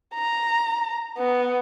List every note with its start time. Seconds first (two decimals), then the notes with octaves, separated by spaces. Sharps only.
0.14 A#5
1.18 B3